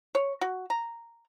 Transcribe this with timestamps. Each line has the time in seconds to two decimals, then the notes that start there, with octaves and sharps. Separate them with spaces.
0.15 C#5
0.41 F#4
0.70 A#5